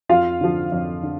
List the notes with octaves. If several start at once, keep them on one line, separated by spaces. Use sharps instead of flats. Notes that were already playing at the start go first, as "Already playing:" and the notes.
F2 F4 F5
D3 F3
F2
D3